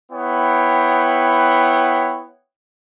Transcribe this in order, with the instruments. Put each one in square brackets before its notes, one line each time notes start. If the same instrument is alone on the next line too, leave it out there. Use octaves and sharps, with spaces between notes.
[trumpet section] B3 E4 C#5 F#5 G5